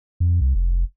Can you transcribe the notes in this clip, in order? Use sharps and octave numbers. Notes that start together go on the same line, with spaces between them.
F2
C2
F1